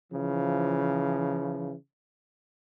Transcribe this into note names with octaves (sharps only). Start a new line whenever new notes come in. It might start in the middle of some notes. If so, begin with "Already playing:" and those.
C#3 E3 F3